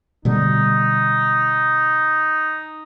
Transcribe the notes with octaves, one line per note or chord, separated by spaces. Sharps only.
B2 D3 G3 D#4